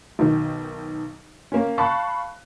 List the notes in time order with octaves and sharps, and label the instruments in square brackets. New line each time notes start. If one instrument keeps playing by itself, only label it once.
[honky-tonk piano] B1 D#3
A#3 C#4
F5 A5 B5 C#6 F#6